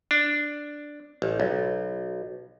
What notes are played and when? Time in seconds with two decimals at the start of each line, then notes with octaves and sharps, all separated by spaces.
0.11 D4
1.22 A1
1.40 B1